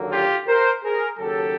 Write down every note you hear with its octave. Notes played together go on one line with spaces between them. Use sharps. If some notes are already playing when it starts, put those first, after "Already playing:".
Already playing: D#2 D3 F#3 A#3
F4 G4
A#4 C5
G#4 A#4
D#2 C#3 F#3 G4 A4